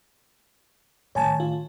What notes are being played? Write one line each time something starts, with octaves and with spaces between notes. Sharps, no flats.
A2 D#3 C#5 G#5 A5
F4